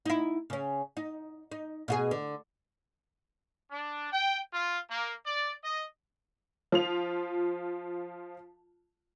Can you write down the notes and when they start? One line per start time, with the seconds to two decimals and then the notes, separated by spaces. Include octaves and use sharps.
0.06 D#4 E4
0.50 C#3 C#4
0.97 D#4
1.52 D#4
1.88 B2 F4 G#4
2.11 D3
3.71 D4
4.13 G5
4.52 F4
4.89 A#3
5.25 D5
5.64 D#5
6.72 F3 F4 F7